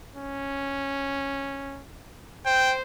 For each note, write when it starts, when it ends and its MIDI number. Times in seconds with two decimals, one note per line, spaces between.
0.16 1.83 61
2.46 2.82 72
2.46 2.74 79